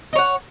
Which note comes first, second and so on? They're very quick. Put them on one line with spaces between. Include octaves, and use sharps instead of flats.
D#5 C#5 F#5